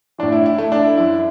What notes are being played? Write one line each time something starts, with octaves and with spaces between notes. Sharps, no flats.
A2 E3 D4
E4
E4
A3
D4
E4
F#2 E3 E4